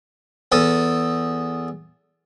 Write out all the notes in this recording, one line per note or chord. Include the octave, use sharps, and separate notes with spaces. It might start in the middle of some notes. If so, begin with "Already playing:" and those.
E2 A4 D#6